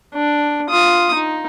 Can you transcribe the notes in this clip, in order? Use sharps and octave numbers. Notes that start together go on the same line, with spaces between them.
D4
F4 D#6
D#4